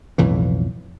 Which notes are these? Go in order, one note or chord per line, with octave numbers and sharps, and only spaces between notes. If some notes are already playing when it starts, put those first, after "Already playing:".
B1 F2 A2 E3